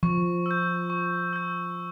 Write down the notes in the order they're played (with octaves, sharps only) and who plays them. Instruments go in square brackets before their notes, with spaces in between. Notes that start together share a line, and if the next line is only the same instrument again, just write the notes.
[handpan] F3 [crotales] C#6
[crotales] E6 G6
C#6
E6 G6